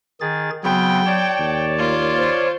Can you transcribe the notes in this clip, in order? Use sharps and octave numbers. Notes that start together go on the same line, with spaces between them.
D#3 G#4 A6
C#3 F#3 B3 C4 G5
C#5 D5 A5
D#2
A#3 F4
C5